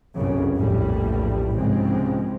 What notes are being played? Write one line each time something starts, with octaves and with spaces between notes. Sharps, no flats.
G1 C2 F#2 C#3
A#1 E2 A2 G3
C2 G#2 C#3 F3 G#3 C4